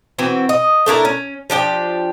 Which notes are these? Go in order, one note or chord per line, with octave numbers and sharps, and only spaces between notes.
E3 C4 F#4
D#5
A3 D4 E4 A#4
C#4
F3 D4 G4 G5